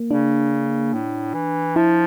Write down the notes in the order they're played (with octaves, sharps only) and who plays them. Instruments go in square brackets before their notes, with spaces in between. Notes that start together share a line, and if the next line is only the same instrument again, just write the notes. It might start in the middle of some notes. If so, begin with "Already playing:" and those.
Already playing: [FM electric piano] A#3
[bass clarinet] C#3 [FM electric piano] D4
[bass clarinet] A2
E3
[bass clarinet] F3 [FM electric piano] E4